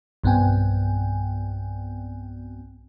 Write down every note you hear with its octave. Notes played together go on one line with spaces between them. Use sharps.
B1 G2 B3 C4 G5 G#5